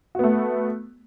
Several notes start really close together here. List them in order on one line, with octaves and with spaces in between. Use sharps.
F#4 B3 A3